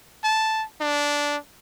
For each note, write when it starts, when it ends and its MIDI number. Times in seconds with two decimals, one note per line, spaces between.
0.24 0.64 81
0.81 1.36 62